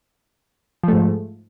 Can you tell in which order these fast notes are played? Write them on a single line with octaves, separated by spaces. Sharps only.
F3 A3 G#2